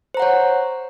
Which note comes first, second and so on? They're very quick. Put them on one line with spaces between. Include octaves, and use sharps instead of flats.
C5 A#5 F#5 C#5